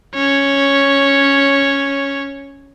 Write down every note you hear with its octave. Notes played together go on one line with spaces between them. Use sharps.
C#4 C#5